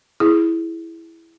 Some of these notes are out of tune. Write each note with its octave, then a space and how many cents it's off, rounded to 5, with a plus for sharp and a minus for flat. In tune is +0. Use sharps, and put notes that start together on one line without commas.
E4 +0 G#4 +0